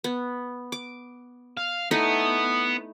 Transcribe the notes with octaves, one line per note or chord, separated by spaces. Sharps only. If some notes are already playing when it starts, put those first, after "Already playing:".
B3
D6
F5
A3 B3 D#4 E4